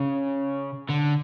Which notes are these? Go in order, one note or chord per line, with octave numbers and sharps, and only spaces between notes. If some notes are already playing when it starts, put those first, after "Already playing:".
Already playing: C#3
D3